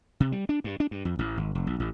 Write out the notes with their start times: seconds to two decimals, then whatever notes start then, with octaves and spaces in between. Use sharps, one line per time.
0.20 C3
0.32 G3
0.49 D4
0.64 G2
0.80 D4
0.91 G2
1.05 F2
1.19 A1
1.37 G#1
1.55 F1
1.67 B1
1.80 A1